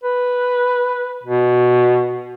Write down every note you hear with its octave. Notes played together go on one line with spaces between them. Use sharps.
B4
B2